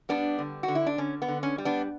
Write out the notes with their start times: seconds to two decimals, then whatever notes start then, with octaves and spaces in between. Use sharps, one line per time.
0.09 G3 B3 D4
0.38 D3
0.63 F#4
0.68 D3
0.75 E4
0.87 D4
0.98 D3 C#4
1.22 B3
1.28 D3
1.43 C#4
1.58 G3
1.65 B3 D4